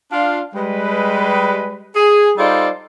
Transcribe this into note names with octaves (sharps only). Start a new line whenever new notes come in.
D4 F4 F5
G3 G#3 B4
G#4
G3 D#4 F4 A4 C5 D5